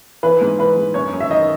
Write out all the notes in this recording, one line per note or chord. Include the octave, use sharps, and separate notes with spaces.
E3 B4
G#2
E3 B4
G#2
F#2 C#5
F#2
E5
D#3 D#5